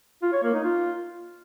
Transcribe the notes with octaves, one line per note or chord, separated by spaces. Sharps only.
F4
C#5
A#3
D#4
F4